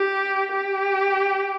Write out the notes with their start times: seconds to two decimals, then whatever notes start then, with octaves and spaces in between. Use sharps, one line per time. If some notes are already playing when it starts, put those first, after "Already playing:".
Already playing: G4
0.52 G4